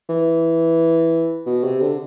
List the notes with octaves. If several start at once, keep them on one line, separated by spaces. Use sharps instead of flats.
E3
B2
C3
D3